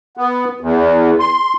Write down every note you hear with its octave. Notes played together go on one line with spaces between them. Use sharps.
B3
E2
C6